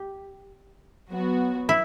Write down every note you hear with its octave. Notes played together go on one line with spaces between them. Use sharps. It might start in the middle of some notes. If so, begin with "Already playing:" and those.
Already playing: G4
F#3 B3 F#4
E4